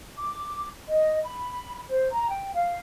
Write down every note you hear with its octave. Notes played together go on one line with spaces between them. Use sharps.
D6
D#5
B5
C5
A#5
G5
F5